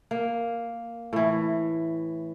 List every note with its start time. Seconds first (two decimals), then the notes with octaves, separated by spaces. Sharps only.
0.11 A#3
1.13 A2 E3